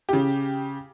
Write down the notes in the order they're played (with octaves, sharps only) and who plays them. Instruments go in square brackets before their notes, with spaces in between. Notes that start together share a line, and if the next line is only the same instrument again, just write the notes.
[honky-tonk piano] C#3 G4